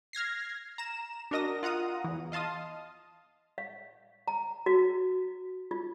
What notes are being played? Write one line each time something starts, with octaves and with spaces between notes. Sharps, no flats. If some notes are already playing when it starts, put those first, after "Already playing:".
F6 G#6 A#6 C7
A#5 E7
D4 F#4 A#4 D#5 D#6 A#6
F4 F#5 A#5 D#6
E2 E3
D#5 F5 A5 C6 D#6
F5
A#5
F#4
F4